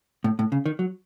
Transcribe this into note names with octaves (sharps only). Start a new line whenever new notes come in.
A2
A2
C#3
D#3
F#3